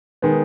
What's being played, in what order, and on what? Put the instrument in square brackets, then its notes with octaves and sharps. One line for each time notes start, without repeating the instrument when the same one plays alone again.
[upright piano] D#3 G#3 B3